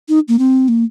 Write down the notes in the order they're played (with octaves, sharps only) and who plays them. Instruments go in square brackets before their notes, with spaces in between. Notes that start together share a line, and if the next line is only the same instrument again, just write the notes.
[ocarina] D#4
A#3
C4
A#3